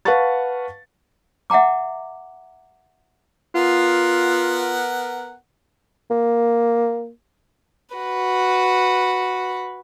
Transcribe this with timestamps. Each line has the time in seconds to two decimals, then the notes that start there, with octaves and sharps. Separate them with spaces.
0.05 B4 F5 F#5 A5 C#6 A6
1.50 E5 F#5 G5 A#5 D6
3.55 B3 F4 A#4 F#5
6.10 A#3
7.95 F#4 B4